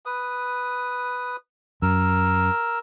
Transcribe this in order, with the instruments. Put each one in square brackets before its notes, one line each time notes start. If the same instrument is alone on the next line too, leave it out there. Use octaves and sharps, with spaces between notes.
[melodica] B4 D#6
[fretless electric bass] F#2 [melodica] A#4 E6